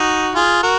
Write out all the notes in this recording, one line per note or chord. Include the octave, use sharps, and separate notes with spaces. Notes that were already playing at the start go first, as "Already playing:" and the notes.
Already playing: D#4 F#4
F4 G#4
F#4 A#4